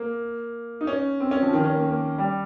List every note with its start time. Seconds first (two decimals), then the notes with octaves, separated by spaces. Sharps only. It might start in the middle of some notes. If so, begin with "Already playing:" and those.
Already playing: A#3
0.81 D#4
0.87 C#4
1.20 C4
1.31 C#4
1.42 F3
1.53 D#3
1.64 C#4
1.75 A#3
1.86 A#3
2.18 G3